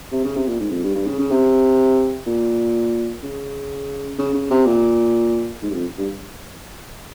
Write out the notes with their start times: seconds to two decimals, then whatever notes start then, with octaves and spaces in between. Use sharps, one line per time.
0.12 C3
0.24 C#3
0.36 C3
0.47 A#2
0.60 G#2
0.71 F2
0.83 G2
0.95 G2
1.07 C#3
1.19 C#3
1.31 C3
2.26 A#2
3.23 C#3
4.19 C#3
4.34 C#3
4.51 C3
4.66 A#2
5.62 G#2
5.70 G2
5.73 F2
5.98 G2